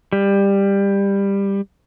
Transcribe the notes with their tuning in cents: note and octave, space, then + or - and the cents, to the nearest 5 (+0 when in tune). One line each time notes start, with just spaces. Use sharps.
G3 +15